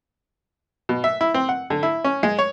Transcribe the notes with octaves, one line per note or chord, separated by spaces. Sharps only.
B2
E5
E4
C4
F#5
D3
E4
C#4
G#3
C#5